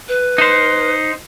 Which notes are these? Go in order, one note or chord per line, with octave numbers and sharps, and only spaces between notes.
B4
D#4 C5